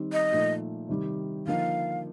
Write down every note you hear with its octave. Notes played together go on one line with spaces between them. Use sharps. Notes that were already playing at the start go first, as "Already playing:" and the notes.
Already playing: D#3 G3 C4 D#4
D#5
A#2 F3 A3 D#4
C3 D#3 G3
D3 F3 A#3 D#4 F5